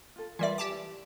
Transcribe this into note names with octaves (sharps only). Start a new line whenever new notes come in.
F4 A4
E3 G3 F4 A#4 D5 E5
G4 G#5 A5 D6
E4